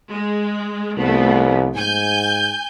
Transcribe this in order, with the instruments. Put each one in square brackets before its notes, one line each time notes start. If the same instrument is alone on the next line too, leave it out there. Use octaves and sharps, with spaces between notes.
[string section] G#3
[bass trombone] C2 [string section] F3 A3 B3
[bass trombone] G#2 [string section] G#5 G6